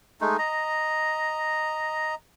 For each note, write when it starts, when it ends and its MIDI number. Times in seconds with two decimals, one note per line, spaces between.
0.21 0.37 56
0.21 0.37 57
0.21 0.37 63
0.39 2.15 75
0.39 2.15 82